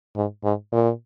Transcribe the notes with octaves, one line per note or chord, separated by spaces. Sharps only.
G#2
G#2
A#2